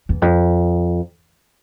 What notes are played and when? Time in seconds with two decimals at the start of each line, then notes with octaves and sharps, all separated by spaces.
0.09 E2
0.22 F2